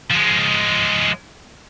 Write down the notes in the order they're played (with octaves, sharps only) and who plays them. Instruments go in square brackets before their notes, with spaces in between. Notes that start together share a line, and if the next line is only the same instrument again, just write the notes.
[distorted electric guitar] F3 G#3